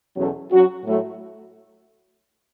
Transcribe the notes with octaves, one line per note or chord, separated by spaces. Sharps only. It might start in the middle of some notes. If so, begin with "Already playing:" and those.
E2 B2 F#3 C#4 A4
F#3 C#4 F#4
A2 F#3 A3